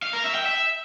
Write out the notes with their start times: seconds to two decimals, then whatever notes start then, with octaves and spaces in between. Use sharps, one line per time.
0.03 F5
0.13 A#4
0.24 E5
0.35 G5
0.46 E5